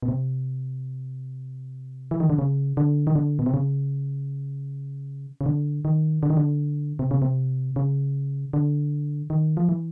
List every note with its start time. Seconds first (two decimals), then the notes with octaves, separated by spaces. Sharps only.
0.03 B2
0.08 C3
2.11 E3
2.20 D#3
2.30 D3
2.39 C#3
2.77 D3
3.07 D#3
3.15 D3
3.39 B2
3.46 C3
3.54 C#3
5.41 C#3
5.46 D3
5.85 D#3
6.23 D3
6.30 D#3
6.37 D3
6.99 C3
7.11 C#3
7.22 C3
7.76 C#3
8.53 D3
9.30 D#3
9.57 F3
9.69 E3